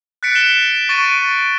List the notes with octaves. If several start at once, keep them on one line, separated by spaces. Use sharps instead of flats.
F#6 A6 B6 C#7 D7
E7 G7
C#6 A6 D7 D#7